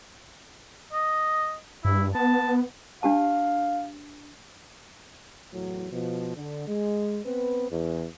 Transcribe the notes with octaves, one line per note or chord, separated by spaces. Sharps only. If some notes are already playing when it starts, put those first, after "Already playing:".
D#5
G2 E4
B3 A5
D4 G4 F5 A5
E2 A2 F#3
B2 F3
D3
G#3
B3 C4 B4
E2